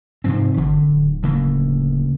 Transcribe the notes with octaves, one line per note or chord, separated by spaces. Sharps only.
G#2 C3 F3 C4
G#1 D3
D1
D2 C#3 A#3